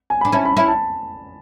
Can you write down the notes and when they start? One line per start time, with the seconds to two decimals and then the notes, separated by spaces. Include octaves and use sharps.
0.10 G#5
0.21 D4 B5
0.32 C#4 E4 A5
0.45 B5
0.56 C#4 E4 B5
0.68 A5